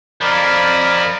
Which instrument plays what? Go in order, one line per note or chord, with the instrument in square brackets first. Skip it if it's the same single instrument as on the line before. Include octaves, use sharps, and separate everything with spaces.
[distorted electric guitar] F2 F3 [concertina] A#4 D5 B5